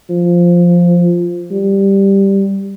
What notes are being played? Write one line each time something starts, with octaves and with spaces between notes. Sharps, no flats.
F3
G3